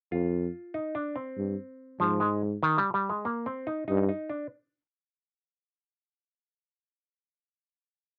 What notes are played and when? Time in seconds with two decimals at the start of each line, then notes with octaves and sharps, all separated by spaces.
0.11 F2 F4
0.74 D#4
0.95 D4
1.16 C4
1.37 G2
2.00 G#2 F3
2.20 G#3
2.63 D#3
2.78 G3
2.94 G3
3.10 G#3
3.25 A#3
3.46 C4
3.67 D#4
3.88 G2 D#4
4.09 D#4
4.30 D4